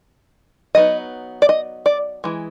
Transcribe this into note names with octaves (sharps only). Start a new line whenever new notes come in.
F#3 B3 D#4 D#5
D5
D#5
D5
E3 G#3